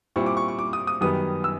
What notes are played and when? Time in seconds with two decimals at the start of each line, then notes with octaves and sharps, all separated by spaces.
0.16 A#2 G3 C4 E4 C#6
0.26 D6
0.37 C#6
0.48 C#6
0.59 D6
0.73 D#6
0.87 D#6
1.01 F#2 D#3 G3 B3 D#6
1.44 E6